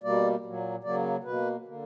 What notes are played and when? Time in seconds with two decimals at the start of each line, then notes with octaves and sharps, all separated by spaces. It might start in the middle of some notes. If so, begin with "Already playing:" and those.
0.03 B2 G3 A#3 D5
0.44 A#2 F#3 A#3
0.84 C#3 F#3 A#3 D5
1.24 B2 A#3 B4
1.65 D3 A#3